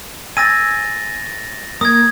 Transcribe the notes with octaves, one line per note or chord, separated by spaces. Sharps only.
G#5 E6 A6 A#6 D#7
A#3 D#6 G#6